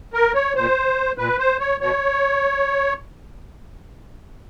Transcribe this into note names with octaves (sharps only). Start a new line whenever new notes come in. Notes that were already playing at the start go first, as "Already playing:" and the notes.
A#4
C#5
A#2 C5
A#2 B4
C5
C#5
B2 C#5